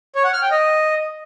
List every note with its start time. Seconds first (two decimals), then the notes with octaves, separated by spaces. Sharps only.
0.15 C#5
0.24 F#5
0.33 F6
0.42 G5
0.51 D#5